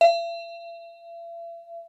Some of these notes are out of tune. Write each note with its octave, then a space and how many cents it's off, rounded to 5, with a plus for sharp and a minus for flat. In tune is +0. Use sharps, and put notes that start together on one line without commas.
E5 +45